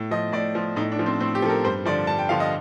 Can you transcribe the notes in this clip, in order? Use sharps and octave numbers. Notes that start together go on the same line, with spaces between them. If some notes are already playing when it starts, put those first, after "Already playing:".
Already playing: A2
F3 D#5
A2 D5
F3
A2 D#4
D4
F3
C4
A2 C4
G4
F3 A4
A#4
G2 C5
D3 F3 D5
G2 A5
G5
D3 F3 F5
D#5